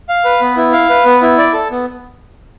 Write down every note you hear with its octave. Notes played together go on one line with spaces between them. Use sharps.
F5
B4
B3
E4
F5
B4
B3
E4
D5
A4
B3